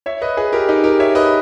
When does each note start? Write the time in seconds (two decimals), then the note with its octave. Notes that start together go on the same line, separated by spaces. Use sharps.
0.06 C#5 E5
0.22 B4 D#5
0.37 G#4 B4
0.52 G4 A#4
0.69 D#4 G4
0.84 G4 A#4
1.00 C#5 E5
1.15 B4 D#5